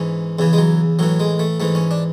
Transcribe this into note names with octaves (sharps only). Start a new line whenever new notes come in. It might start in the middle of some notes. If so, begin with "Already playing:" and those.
Already playing: G#2 E3 C#4
E2 C#3 E3
G#3
F#3
A2 E3 F#3
G#3
A3
G#2 E3 A3
C#4
D4